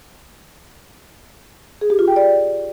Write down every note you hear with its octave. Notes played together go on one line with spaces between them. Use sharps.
G#4
G4
F4
G5
D5